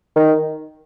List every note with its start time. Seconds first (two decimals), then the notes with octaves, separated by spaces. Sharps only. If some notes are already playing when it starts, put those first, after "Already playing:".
0.16 D#3